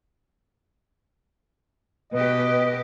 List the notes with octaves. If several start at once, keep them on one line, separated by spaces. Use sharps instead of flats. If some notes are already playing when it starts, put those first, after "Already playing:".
B2 G4 B4 D#5